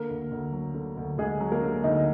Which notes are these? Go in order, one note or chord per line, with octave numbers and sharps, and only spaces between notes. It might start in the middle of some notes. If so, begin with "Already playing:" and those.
Already playing: D3 A#3 A#4
D2
D2
F#3
D3
D2
D2 G#3 G#4
F#3
A#3 A#4
D3
D2 D#4 D#5